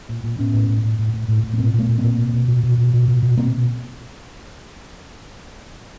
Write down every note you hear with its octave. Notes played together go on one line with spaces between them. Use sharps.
A#2
A#2
A2 B3 C#4
A2
A2
A2
A2
A2
A2
A2
B3
A#2 A#3 C4
A#2 A3 B3
A#2
A#3 C4
A#2
B2
B2
B2
B2
B2
B2
B2
B2
B2 A#3 C4
B2